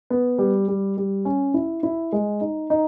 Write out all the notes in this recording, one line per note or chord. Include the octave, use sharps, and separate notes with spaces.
B3
G3
G3
G3
C#4
E4
E4
G#3
D#4
D#4